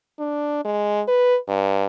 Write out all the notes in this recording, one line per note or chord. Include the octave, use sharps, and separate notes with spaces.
D4
G#3
B4
G2